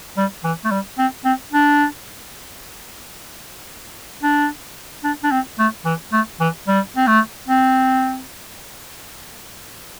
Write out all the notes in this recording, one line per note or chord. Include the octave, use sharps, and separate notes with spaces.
G3
E3
A3
G3
C4
C4
D4
D4
D4
D4
C4
A3
E3
A3
E3
G3
C4
A3
C4